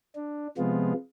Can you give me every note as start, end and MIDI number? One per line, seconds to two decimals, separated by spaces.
0.15 0.48 62
0.58 0.93 48
0.58 0.93 53
0.58 0.93 56
0.58 0.93 59
0.58 0.93 65